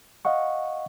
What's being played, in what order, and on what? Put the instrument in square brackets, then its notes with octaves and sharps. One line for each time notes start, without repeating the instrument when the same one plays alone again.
[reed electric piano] D#5 F5 F#5 C#6